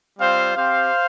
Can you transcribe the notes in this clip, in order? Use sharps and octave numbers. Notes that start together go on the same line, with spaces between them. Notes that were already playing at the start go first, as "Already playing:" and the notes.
G3 C4 F4 C5 F5
C4 G4 C5 F5